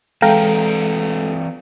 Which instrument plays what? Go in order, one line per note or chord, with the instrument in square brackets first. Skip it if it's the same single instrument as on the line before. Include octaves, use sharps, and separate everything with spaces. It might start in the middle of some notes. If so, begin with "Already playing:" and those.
[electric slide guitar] E3 C4 B4 [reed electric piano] G#3 A4 [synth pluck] F5 G5 A#5